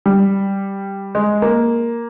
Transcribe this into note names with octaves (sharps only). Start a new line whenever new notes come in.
G3
G#3
A#3